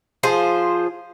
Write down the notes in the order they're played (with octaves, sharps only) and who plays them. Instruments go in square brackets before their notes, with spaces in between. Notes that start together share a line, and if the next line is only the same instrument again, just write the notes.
[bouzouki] F3 F4 G#4 C5